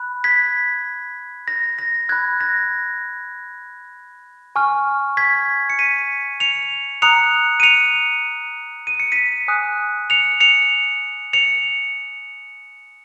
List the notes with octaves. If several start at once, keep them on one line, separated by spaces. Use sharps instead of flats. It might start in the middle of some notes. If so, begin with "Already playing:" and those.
Already playing: B5 F#6
G#6 B6
A#6
A#6
B5 F#6 G#6
A#6
G#5 C#6 F6
G#6 B6
C#7
B6 D#7
C#7 F7
A#5 D#6 F#6 C#7 F7
D#7
C#7 F7
D#7
C#7
B6 D#7
G#5 D#6 F#6
C#7 F7
C#7 F7
C#7 F7